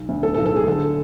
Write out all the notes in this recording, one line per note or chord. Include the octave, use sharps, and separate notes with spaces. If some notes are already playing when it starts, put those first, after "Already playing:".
Already playing: B1
D2
A2 A4
A4
B1
A4
G#3 G#4
D3 A4